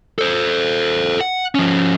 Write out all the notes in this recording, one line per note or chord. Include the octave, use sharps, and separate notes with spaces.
A4 C5
F#5
F3 C#4